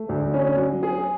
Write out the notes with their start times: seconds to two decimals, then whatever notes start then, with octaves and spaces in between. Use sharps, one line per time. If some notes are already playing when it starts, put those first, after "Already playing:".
Already playing: A3
0.09 D2
0.34 C#4
0.57 F#3
0.83 G#4